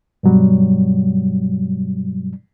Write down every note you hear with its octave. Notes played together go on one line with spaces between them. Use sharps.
G2 B2 F#3 G3